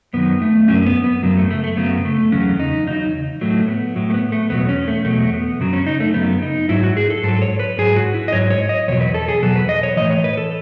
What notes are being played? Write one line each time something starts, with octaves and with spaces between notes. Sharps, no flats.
F#2 D#3 F#3 B3
A3
F#2 D#3 F#3 C#4
B3
B3
F#2 C#3 F#3
A3
A3
A3
F#2 C#3 F#3 B3
A3
E2 C#3 F#3 C#4
D#4
E2 C#3 F#3 D#4
A2 F#3 A3
B3
A2 F#3
A3
B3
A3
E2 B2 F#3 B3
C#4
A3
E2 B2 F#3 A3
B3
F#2 C#3 F#3
C#4
D#4
A3
F#2 C#3 F#3 B3
D#4
G#2 F#3 E4
F#4
G#4
A4
G#2 F#3 A4
C#5
B4
G#2 F#3 G#4
F#4
E4
D#5
G#2 F#3 C#5
C#5
D#5
E2 B2 F#3 C#5
B4
A4
G#4
E2 B2 F#3 A4
B4
D#5
C#5
A2 E3 D#5
C#5
B4
A4